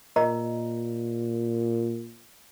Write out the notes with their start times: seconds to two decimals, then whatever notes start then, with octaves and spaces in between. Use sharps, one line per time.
0.16 A#2 A#4 D#5 A#5